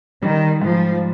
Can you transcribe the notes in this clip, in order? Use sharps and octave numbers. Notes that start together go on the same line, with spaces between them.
D#3 G3
G#2 F3